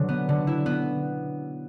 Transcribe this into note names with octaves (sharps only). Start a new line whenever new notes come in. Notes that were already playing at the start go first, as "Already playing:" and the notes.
Already playing: B2 D3 F#3
B3
D3
E4
B3